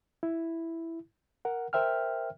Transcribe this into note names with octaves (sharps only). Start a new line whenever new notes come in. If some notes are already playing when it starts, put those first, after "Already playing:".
E4
A#4 F#5
A#4 C5 E5 G5 F6